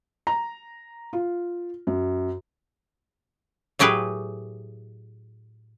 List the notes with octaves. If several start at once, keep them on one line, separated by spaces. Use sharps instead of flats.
A#5
F4
F#2
A2 F#3 G4 G#4 B4